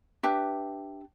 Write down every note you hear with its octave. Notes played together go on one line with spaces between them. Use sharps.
D4 G4 B4 E5